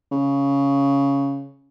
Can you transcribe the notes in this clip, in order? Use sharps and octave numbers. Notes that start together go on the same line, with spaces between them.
C#3